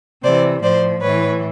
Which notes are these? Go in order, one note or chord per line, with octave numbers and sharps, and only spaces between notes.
C3 E3 C5 D5
A2 F3 C5 D5
A2 E3 B4 C#5